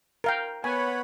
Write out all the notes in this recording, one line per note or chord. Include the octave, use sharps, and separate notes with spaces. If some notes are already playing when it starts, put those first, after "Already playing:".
A#4 F5 G5
B3 C#5 F#5 G#5 B5